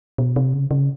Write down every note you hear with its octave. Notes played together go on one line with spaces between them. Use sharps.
B2
C3
C#3
C#3